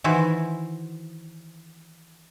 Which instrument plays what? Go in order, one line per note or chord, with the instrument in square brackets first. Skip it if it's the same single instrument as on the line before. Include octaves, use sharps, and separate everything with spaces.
[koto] D#3 E3 E4 F#4 C5